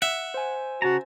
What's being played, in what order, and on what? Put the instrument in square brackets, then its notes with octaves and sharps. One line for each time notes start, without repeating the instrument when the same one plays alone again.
[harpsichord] E5 [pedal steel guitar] F#5
[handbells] C5 G#5
[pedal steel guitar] C#3 A5 A#5 [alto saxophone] F#4